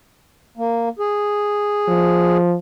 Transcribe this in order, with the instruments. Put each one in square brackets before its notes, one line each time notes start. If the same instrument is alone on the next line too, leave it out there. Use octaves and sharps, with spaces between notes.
[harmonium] A#3
G#4
[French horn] F3